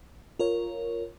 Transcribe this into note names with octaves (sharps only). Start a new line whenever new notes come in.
F4 A#4 C#5